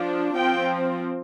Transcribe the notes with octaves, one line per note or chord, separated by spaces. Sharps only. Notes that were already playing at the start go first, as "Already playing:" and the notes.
Already playing: F3 D4
F3 C4 G5